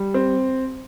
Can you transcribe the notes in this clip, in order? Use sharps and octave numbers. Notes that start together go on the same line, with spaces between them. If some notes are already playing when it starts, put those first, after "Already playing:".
Already playing: G3
C4